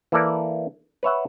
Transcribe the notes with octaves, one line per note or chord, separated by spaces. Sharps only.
E3 A#3 A4 D5
B4 C#5 E5 F#5